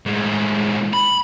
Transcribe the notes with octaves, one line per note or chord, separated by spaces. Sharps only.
A2 G#3
B5